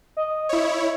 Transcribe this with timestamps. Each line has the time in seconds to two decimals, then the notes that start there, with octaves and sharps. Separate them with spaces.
0.17 D#5
0.49 E4 C#5